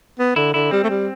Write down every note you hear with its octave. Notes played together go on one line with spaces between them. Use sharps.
B3
D3 E4
D3 E4
G3 C4
A3
G3